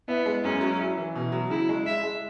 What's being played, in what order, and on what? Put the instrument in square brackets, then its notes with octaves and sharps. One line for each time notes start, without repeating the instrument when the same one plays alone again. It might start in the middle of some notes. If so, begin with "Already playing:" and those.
[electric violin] B3 [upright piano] E4
[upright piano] G#3
[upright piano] F#2 [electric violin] C#4
[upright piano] F#3
E4
E3
B2
F#3
[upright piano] C#3 [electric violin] E4
[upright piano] G#3
[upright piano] E4 [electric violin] E5
[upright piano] G#3